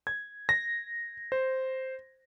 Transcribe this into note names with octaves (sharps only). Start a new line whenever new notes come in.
G#6
A#6
C5